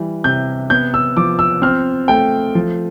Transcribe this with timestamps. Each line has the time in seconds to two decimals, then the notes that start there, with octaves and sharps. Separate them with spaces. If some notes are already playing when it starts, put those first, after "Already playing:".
Already playing: E3 G3
0.24 C3 G6
0.70 B3 G6
0.94 E6
1.17 F3 D6
1.39 E6
1.62 C4 F6
2.08 A3 G5
2.55 F3